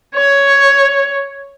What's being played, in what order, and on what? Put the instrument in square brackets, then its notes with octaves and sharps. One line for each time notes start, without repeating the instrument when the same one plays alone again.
[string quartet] C#5